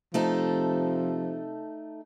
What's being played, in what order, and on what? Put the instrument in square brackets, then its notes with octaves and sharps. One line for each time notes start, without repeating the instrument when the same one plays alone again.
[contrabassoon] C3 [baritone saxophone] F3 [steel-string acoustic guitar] A3 D#4 A4